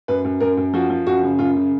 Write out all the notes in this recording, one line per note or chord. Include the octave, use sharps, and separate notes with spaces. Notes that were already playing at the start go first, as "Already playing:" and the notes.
F#2 B4
F#2
F#2 A#4
F#2
F3 F#4
F3
F#2 F#4
C#3
F#2 F4
C#3